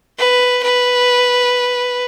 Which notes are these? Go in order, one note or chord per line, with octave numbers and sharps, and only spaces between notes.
B4
B4